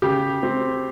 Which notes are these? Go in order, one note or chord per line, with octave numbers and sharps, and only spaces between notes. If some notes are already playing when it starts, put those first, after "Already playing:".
C#3 G4
C4